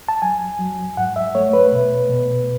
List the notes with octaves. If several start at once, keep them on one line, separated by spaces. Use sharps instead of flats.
A5
F#3 G#5
F#3
G#2 F#5
E5
A3 C#5
B4
B2
B2